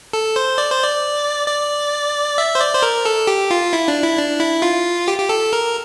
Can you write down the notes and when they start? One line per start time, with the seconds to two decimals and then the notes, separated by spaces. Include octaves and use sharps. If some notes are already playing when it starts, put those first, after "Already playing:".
0.13 A4
0.36 C5
0.58 D5
0.70 C5
0.84 D5
1.48 D5
2.38 E5
2.55 C5
2.60 D5
2.75 C5
2.82 A#4
3.05 A4
3.27 G4
3.51 F4
3.73 E4
3.88 D4
4.02 E4
4.17 D4
4.40 E4
4.62 F4
5.08 G4
5.18 G4
5.29 A4
5.53 A#4